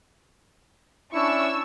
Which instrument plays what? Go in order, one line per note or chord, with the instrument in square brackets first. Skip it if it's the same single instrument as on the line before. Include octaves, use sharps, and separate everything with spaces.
[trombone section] C#4 D4 E4 [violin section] C#6 E6